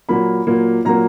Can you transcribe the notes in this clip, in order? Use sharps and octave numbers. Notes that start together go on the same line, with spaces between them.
A#2 F#3 A#3 B5
A#2 F#3 A#3
A#2 F#3 A#3 A#5